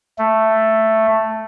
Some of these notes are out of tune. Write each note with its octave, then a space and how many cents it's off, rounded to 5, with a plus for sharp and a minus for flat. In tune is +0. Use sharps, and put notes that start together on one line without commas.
A3 +5